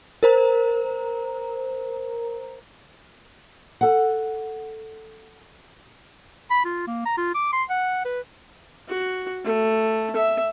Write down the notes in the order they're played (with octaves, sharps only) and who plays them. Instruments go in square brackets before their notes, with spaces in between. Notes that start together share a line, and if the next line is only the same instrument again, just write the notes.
[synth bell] A#4 C5 A#5
[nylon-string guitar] A4 F#5
[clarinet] B5
F4
A#3
A#5
F4
D6
C6
F#5
B4
[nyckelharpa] F#4
A3
E5